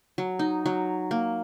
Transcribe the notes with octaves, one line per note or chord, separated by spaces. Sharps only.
F#3
D#4
F#3
A#3